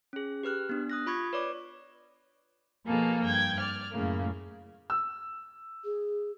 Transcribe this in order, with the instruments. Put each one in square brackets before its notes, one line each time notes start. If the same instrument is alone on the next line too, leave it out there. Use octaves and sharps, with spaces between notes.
[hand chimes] C#4 G#4
G4 B4 F6 F#6
B3 D4
D#6 F#6 A#6
F4 B5 C#6 G#6
B4 C#5 D5 D6
[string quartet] B2 F3 A#3 G#4 A4
G2 G5 G#6
D5 F6
F#2 A2 C#3 A#3
[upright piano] E6
[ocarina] G#4